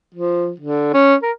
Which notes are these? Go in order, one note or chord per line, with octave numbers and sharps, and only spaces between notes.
F3
D3
C#4
A#4